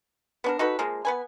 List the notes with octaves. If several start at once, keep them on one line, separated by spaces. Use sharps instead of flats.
B3 D4 A#4
D#4 F#4 A4 B4
F3 G#3 A#3
B3 B4 G#5